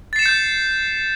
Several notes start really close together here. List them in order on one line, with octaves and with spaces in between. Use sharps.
A6 C7 E7 C#7 G6